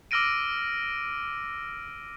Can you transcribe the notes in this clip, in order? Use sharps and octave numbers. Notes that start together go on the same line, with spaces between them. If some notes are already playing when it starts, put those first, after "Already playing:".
D6 E6 F6 A#6 D7 D#7